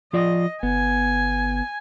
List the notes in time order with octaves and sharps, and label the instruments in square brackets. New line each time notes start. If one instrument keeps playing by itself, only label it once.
[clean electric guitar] F3 F4 D5 [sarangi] D#5
[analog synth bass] G1 [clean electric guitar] B3 [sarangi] G#5